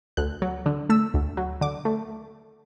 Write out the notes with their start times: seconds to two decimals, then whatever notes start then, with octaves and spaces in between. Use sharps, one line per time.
0.17 D2 F#6
0.42 F#3
0.66 D3
0.89 A3 E6
1.14 D2
1.37 F#3
1.61 D3 D6
1.85 A3